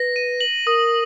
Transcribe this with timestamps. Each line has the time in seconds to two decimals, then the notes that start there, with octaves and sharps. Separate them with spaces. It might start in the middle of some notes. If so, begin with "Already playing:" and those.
Already playing: B4 A#6
0.16 D#7
0.41 F#7
0.66 A#4 D#6